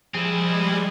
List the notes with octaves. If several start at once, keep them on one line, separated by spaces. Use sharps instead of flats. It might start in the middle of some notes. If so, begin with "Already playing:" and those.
F3 G3 G#3 C4 E4 G#4